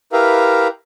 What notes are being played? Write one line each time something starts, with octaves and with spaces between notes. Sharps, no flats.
E4 G4 A#4 B4 E5 F5